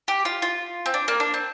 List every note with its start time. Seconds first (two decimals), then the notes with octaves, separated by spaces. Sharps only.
0.08 G4
0.25 F4
0.42 F4
0.86 C4
0.94 D4
1.08 A#3
1.20 D4
1.34 C4